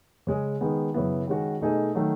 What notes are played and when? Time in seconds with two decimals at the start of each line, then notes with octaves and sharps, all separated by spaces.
0.27 C#3 G#3 C#4 G#4
0.61 D#3 G#3 B3
0.94 F#2 C#3 F#3 B3 E4
1.27 D#3 G#3 C#4 F#4
1.61 B2 A3 D#4 G#4
1.95 D#3 F#3 A3